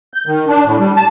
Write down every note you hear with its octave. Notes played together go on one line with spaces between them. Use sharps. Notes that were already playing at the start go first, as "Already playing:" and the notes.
G6
D#3
D4
A2
G3
A5